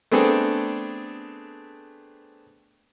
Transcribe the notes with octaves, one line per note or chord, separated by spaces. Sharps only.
A3 B3 C4 D4 G#4 A4